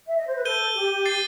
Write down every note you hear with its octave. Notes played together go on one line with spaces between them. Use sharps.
E5
D#5
C5
B4
A4 G6 D#7 G7
G4
A6 C7 D#7 G7